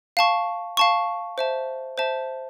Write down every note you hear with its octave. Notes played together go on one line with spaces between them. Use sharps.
F5 A5 C#6
F5 A5 C#6
C5 E5 A5
C5 E5 A5